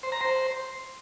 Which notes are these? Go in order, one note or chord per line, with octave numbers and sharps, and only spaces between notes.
C5
A#5
C5